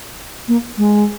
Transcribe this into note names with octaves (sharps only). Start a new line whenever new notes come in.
A#3
G#3